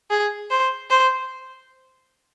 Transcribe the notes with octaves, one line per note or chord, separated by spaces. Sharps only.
G#4
C5
C5